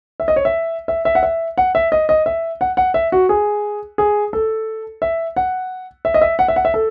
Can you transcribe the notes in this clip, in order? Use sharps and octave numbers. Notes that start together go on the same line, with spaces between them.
E5
D#5
C#5
E5
E5
E5
F#5
E5
F#5
E5
D#5
D#5
E5
F#5
F#5
E5
F#4
G#4
G#4
A4
E5
F#5
E5
D#5
E5
F#5
E5
F#5
E5
A4